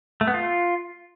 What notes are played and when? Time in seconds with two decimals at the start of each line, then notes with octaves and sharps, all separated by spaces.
0.21 A3
0.27 B3
0.34 F4